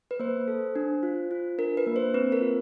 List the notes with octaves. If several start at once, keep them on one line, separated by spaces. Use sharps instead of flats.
B4
A#3 C5
A4
D4
F4
F4
D4 A#4
B4
A#3
C5
C4 B4
A#4
F4